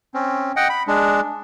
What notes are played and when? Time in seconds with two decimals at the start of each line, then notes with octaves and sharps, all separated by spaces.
0.14 C4 C#4
0.56 D#5 F#5 G5
0.69 B5
0.87 G#3 D4